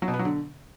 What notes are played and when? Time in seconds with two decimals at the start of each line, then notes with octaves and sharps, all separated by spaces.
0.02 F#3
0.08 B2
0.14 B3
0.19 F#3
0.25 D3